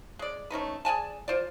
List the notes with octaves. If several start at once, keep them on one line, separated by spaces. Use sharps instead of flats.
G#3 D5
A3 C#4 D#4 B4
G#4 D5 G#5 A5
F4 C5 D5